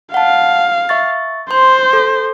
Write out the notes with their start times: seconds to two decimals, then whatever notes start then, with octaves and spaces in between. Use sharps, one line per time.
0.14 F5 F#5 A5
0.89 E5 C#6 A6
1.51 C5 C6
1.93 A4